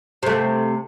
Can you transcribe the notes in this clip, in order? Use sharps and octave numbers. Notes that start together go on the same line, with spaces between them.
C3 A3